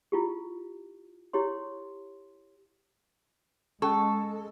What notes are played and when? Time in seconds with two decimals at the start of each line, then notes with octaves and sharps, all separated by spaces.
0.12 E4 F4 G4
1.33 E4 G4 C#5 C6
3.82 G#3 C#4 A4 A5 C#6